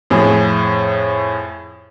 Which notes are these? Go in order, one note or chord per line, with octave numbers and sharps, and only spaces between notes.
F2 A2 G#4